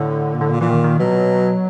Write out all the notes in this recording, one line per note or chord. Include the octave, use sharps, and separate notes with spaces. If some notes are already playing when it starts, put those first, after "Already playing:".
Already playing: A2 D3
A#2
A2 D3
A#2
A#2 E3
D#3
D#3
B2 F#3